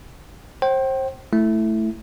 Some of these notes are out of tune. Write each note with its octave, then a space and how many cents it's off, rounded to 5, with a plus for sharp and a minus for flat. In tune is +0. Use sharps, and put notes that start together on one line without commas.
C5 +30 G5 -30
A3 +0 E4 +0